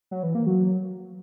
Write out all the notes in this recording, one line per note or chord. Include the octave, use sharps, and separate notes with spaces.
F#3
E3
A#3
F#3